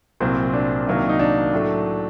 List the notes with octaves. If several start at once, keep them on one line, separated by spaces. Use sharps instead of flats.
C2 A#2 F#3 C4
D4
C2 C3 D#3 F#3 A#3
D#4
D4
A2 F#3 A3